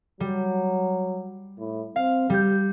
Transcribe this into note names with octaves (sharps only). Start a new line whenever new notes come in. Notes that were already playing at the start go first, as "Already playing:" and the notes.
F#3 G3
A2
C4 F5
G3 G4 G6